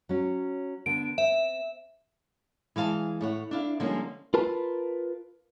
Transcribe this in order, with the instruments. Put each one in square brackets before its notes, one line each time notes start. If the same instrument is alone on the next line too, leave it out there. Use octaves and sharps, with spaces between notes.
[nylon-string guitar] F#3 C#4
[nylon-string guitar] D3 B3 [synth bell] D7
[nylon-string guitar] C4 [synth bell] E5
[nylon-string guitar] E3 G#3 F5 A5
A2 C#5 F#5
D4 E4 F5
D3 F3 G3 G#3 A#3 C#4
[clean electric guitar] F4 A#4 B4 A5